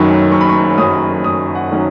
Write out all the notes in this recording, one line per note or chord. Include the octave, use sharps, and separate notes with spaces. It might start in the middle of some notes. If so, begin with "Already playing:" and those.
Already playing: F#1 F#2 D#3 F#3 C#4 B5 C#6
F#1 C#6
B5
C#6
F#2 D#3 F#3 C#4 D#6
F#1 D#6
F#5
D#3 F#3 C#4